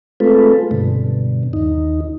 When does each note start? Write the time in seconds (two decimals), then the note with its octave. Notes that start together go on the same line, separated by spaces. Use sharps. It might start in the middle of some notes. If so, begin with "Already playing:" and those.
0.20 G#3 A3 C4 F4 A4 B4
0.71 G2 B2 D3
1.53 D#2 D#4